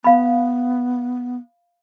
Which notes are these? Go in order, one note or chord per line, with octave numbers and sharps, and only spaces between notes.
B3 F5 B5